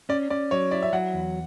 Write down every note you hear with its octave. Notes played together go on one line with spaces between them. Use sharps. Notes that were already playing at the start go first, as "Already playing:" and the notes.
C#4 D5
C#4 D5
F#3 C#5
E4 D5
E5
F#3 F#5
E2